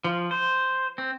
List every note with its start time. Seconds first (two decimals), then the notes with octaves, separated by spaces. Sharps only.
0.04 F3
0.31 C5
0.98 C4